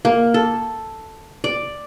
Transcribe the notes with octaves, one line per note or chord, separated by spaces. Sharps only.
A#3
A4
D5